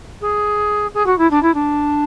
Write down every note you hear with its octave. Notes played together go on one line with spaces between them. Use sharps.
G#4
G#4
F#4
E4
D4
E4
D4